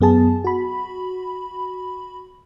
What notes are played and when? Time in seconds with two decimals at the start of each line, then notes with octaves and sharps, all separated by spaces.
0.01 F#2 B3 G#4 A5
0.44 F#4 B5